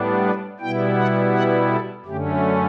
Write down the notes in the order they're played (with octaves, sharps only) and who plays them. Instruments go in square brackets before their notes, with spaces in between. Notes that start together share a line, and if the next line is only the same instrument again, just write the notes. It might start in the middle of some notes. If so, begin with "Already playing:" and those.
Already playing: [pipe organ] A2 G3 B3 D4
B4
B2 G3 B3 E4 G5
F#5
F#5
A4
F#2 D3 A3 C#4 G4